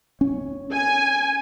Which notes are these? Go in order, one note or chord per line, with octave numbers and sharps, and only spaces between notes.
C#4
G#5